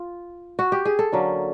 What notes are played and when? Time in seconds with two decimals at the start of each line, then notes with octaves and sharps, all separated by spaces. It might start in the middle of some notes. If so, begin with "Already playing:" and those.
Already playing: F4
0.59 F#4
0.72 G4
0.85 G#4
0.99 A4
1.12 D3 F#3 A#3 C#4